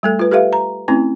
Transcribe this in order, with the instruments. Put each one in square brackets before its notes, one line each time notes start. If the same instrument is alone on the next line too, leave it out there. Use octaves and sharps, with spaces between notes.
[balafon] G3 A3 A4
F4 B4
G4 A4 B4 E5 F5
A#5
A3 C4 C#4 E4